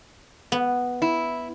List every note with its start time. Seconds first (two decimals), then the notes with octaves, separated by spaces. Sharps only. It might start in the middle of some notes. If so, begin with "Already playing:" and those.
0.52 B3
1.02 E4